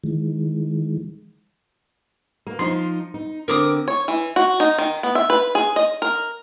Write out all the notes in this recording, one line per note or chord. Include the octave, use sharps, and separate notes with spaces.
D#3 E3 G#3
A#3
F3 D#4 C6
D#4
D3 C4 A#4 D6 D#6
C#5
E3
F#4
D#4
D#3
B3
E5
B4
G#4
D#5
A#4